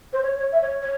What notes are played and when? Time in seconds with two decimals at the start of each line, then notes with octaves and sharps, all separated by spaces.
0.13 C5
0.23 C#5
0.38 C#5
0.52 E5
0.62 C#5
0.82 C#5